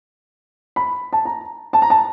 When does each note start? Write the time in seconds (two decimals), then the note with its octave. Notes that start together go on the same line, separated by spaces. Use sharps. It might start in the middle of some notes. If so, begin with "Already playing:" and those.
0.76 B5
1.13 A5
1.25 A#5
1.73 A5
1.82 A#5
1.90 A5